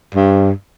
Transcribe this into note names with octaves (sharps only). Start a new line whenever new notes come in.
G2